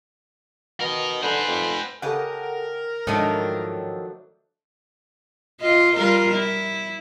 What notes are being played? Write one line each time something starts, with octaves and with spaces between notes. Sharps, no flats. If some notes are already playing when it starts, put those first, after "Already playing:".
B2 A#4 D#5
D3 B4 C5 G#5 G6
F2
C#3 G4 A4 A#4 D#5 F#5
G#2 D#3 F3 F#3 A3 D4
F4 D#5
G3 F4 A#4
E4